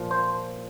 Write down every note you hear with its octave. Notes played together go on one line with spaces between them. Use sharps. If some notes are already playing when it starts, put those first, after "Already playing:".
Already playing: A#2 F3
C5